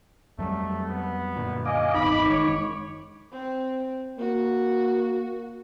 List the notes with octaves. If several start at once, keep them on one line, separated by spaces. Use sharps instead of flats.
F2 F#3 G3 A3
B3
F#2 A#2 D3
D#5 F5 G#5 D6
G#1 E2 C3 D#4 B5 D6
F#1 D#3 G#3 C#5
C4
A#3 F#4